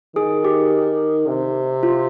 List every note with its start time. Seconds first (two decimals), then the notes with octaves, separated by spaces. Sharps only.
0.16 D#3 G#4
0.45 G4
1.28 C3
1.83 F4